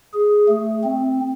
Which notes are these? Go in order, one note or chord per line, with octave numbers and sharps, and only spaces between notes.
G#4
A3
C4